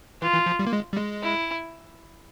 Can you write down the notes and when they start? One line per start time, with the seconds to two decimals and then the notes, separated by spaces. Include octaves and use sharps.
0.22 E3 F4
0.34 E3
0.46 F3
0.59 G3
0.67 A#3
0.73 G#3
0.93 G3
0.97 G#3
1.22 E4